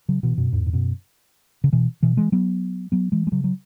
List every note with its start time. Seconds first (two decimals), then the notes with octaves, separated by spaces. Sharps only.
0.09 C#3 F#3
0.23 B2 E3
0.38 F#2 B2
0.53 E2 G#2
0.66 G#2
0.73 F#2 B2
1.64 C#3
1.73 B2 E3
2.03 B2 E3
2.17 E3 G#3
2.32 F#3 B3
2.92 F#3 B3
3.12 E3 G#3
3.27 G#3
3.32 C#3 F#3
3.44 F#3